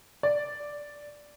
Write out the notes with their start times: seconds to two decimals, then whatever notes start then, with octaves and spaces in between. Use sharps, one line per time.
0.23 D5